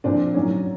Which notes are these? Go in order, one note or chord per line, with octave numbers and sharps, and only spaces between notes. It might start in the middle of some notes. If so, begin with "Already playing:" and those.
A#2 F3 C4 D4
A2 F#3 C#4 D#4